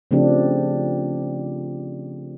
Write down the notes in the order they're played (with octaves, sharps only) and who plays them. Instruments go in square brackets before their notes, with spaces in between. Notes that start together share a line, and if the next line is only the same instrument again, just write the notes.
[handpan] C#3 F3 A3 C4 D4 G4